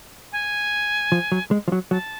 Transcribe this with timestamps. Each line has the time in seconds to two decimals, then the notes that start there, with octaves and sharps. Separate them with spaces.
0.32 G#5
1.12 F3
1.32 F#3
1.51 G#3
1.68 F3
1.72 F#3
1.91 F#3 A5